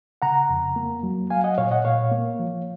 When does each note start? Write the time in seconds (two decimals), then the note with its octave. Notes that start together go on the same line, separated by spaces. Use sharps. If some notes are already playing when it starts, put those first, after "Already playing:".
0.22 C#3 F#5 A#5
0.49 F2
0.76 A#3
1.03 F#3
1.30 F#3 F5 G#5
1.44 D#5 F#5
1.58 A#2 C#5 F5
1.71 D#5 F#5
1.85 A#2 C#5 F5
2.12 A#3
2.39 F3